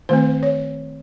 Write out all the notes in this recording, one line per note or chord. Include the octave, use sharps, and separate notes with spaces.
D#3 A3 C4 C5
C#5